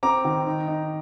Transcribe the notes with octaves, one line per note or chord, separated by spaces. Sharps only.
C4 A#5 D6
D#3
D#4
D#4